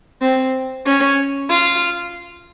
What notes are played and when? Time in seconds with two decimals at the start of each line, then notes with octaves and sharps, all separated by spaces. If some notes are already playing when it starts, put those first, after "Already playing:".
0.21 C4
0.86 C#4
1.50 F4